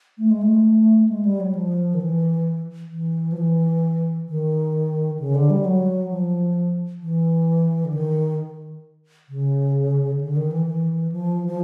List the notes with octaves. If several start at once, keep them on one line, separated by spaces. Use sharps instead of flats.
A3
G#3
A3
G#3
G3
F#3
F3
D#3
E3
E3
F3
E3
D#3
C#3
D3
G3
F#3
F3
E3
D3
D#3
C#3
D3
D#3
E3
E3
F3
F3